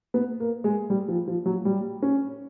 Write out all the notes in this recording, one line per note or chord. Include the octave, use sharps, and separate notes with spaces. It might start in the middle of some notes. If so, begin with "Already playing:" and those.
B3
A#3
G#3
G3
F3
F3
F#3
G3
C#4